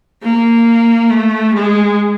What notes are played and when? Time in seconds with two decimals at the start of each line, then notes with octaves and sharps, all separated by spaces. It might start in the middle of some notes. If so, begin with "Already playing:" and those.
0.23 A#3
1.10 A3
1.54 G#3